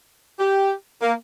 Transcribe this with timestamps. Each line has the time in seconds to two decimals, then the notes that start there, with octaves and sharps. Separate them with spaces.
0.39 G4
1.01 A#3